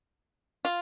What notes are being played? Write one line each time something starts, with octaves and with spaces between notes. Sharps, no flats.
F4